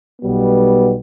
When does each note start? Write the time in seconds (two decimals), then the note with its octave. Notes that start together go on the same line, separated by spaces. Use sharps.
0.20 B1 B2 G3 B3